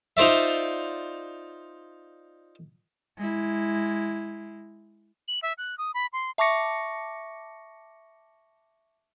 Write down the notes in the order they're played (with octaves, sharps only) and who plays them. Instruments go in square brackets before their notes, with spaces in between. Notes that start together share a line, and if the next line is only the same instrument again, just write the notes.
[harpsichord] D#4 F4 C5 D5 E5
[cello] G#3 E4
[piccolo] F#7
E5
F#6
D#6
B5
C6
[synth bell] E5 A5 C#6 D6 A#6 C#7